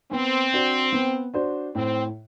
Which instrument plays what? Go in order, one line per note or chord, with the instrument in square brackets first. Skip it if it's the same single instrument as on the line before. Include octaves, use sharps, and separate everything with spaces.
[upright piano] B3 [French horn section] C4
[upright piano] D4 F#4 C5
B3
D4 F#4 C5
[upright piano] A2 [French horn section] C4